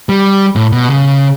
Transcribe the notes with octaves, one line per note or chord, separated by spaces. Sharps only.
G3
A2
B2
C#3